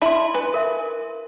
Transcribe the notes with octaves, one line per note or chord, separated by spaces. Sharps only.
E4 E5 A5 B5 C6
B4 G#5
A#4 E5